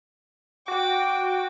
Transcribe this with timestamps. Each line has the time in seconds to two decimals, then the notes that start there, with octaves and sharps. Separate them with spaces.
0.68 F#4 G5 D6